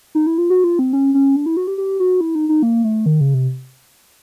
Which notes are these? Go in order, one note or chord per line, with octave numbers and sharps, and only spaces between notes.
D#4
E4
F4
F#4
F4
C4
C#4
C#4
D4
E4
F#4
G4
G4
F#4
E4
D#4
D#4
A#3
A3
D#3
C#3
C3